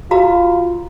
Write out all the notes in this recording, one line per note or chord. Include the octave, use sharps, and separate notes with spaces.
F4 F#4 F5 A#5